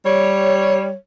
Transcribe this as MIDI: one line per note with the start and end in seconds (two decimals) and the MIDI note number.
0.05 0.94 55
0.05 0.94 73